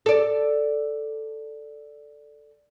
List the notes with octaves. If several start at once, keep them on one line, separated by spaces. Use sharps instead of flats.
A4 D5